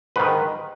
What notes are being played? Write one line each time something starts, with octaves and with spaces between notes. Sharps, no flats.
G#2 D#3 B4